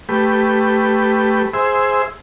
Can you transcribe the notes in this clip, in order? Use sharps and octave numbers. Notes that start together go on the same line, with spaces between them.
A3 G4 B4
G#4 C5 E5